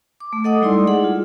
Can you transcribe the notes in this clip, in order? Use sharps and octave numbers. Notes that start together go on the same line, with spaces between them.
D6
A3
A4 D#5 F#5 D6 D#6
G3 G#3 D#4 E4 D5 C6
G#4 F#5
F4